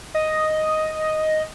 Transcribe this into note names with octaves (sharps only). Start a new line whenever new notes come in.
D#5